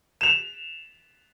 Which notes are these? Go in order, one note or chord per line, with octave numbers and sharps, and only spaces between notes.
E7 F7